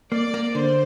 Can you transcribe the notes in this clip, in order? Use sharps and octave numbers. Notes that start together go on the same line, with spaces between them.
A#3 D5
A#3
D3 C5